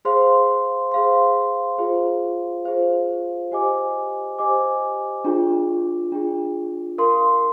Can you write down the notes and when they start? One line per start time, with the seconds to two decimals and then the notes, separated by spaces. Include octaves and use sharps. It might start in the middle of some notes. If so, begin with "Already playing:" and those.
0.05 G#4 C5 F5 C6
0.91 G#4 C5 F5 C6
1.78 F4 G#4 C5 F5
2.65 F4 G#4 C5 F5
3.52 G4 C5 D#5 G#5 D6
4.39 G4 C5 D#5 G#5 D6
5.24 D4 F4 G#4
6.12 D4 F4 G#4
6.98 A#4 F5 C6